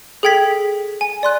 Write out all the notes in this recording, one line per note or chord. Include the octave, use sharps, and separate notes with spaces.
G#4 A4 G5 G#6 B6
G#5
D5 C6 F#6